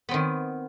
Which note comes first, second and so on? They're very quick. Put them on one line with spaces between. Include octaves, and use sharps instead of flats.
B3 C4 D#3